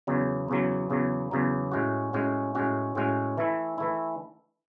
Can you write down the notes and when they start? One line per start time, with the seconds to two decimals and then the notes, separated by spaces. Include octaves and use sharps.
0.07 E2 C#3 F#3
0.48 E2 C#3 F#3
0.90 E2 C#3 F#3
1.31 E2 C#3 F#3
1.72 A2 G#3 C#4 F#4
2.13 A2 G#3 C#4 F#4
2.55 A2 G#3 C#4 F#4
2.95 A2 G#3 C#4 F#4
3.37 E3 A3 E4
3.78 E3 A3 E4